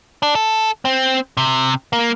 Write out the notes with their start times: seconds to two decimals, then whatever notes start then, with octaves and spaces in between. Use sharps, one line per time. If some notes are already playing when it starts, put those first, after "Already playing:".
0.23 D4
0.35 A4
0.85 C4
1.37 C3
1.93 A#3